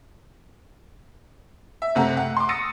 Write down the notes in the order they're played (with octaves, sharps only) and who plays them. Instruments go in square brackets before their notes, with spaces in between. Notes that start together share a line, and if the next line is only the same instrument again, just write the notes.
[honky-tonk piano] E5
F#1 C3 A3 F#5 A#5
F#5
C6 D6
D#6 E6 A6 A#6 C#7 D#7